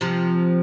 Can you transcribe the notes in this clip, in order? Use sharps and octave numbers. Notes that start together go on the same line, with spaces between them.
C3 F3